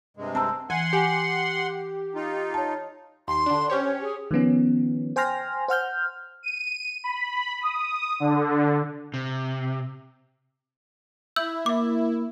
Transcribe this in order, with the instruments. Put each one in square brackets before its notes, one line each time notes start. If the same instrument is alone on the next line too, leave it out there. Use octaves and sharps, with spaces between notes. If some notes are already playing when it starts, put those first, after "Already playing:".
[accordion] G2 C3 G#3
[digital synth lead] C4 [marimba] A5 A#5 E6
[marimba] E3 [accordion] F#5 C6 [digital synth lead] G#5
[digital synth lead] G4 [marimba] G#5
[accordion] D#4 F4
[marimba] C#5 A5
[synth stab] D#2 C7 [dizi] C6
[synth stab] D3 D4
[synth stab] C#4 G4 C#5 [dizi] C5
[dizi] G#4
[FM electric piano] D#3 F3 B3 C#4
C5 G5 G#5 C6 F6 A#6
C5 F#5 F6 G6
[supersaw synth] D#7
B5
D#6
D3
[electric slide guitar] C3
[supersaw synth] E4 [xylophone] E6 G6 F#7
[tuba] A#3 [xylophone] E5 D6